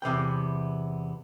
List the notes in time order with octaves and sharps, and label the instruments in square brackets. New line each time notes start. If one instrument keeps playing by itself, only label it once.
[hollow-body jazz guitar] E2 C3 B3 G5